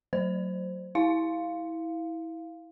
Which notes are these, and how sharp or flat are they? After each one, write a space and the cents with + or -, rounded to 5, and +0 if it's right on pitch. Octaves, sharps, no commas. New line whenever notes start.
F#3 +0 C5 +0
E4 -20 F5 -5